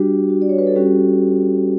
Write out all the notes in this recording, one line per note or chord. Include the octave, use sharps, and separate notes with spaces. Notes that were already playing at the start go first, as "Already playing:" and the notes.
Already playing: G3 D4 F#4 G4
F#4
D5
C#5
B4
A4
G3 C#4 F#4 G4